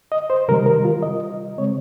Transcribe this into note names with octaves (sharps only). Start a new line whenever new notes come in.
D#5
C5
C3 D#3 G3 A#4
A#4
F4
D#5
C#3 G#3 C4 C#5